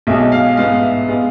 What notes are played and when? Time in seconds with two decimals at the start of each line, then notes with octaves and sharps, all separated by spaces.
0.07 B1 B2 G#3 E5
0.32 F5
0.57 A1 G#2 G#3 B3 F5
0.83 E5
1.08 G#3 B3 F5